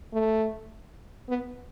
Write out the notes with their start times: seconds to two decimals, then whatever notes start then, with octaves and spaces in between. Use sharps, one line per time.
0.13 A3
1.29 B3